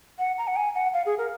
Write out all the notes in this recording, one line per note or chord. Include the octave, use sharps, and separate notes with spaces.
F#5
A#5
F#5
G#5
F#5
F5
G#4
A#4